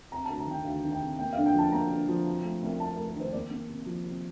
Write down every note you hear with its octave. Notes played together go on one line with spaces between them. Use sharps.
C3 A#5
D2 A5
A#5
D#3 G5
D2 F5
D#3
G5
C3
A#3 G5
D3 F5
G5
F3 A5
A#3 A#5
D3
F3
C3
A3
C2
C3 A5
A#4
A3
A#4
D#3 C5
A#3 D5
A#3
C3
F3
C3